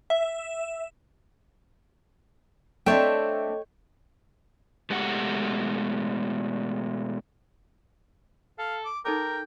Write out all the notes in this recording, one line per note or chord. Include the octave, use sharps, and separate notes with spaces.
E5
A3 C4 D4 A4 C#5 D#5 E5 G5
B2 G#3 A3 G4 F#5
A4 F5
D6
D#4 A4 A#4 G5 D6